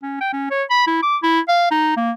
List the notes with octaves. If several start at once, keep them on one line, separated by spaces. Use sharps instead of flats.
C#4
G5
C#4
C#5
B5
E4
D6
E4
F5
D#4
A#3